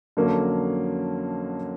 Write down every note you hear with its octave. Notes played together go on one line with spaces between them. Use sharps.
F2 D3 F#3 A#3 C#4